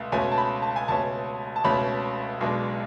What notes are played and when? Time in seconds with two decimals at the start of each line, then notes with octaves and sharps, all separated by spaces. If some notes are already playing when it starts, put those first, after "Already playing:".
Already playing: C#2 B2 A3
0.12 C#2 B2 A3 C#4 G#5
0.32 A5
0.38 B5
0.62 A5
0.76 G#5
0.88 C#2 B2 A3 C#4 A5
1.56 A5
1.64 C#2 B2 A3 C#4 B5
2.40 B1 B2 G#3 D4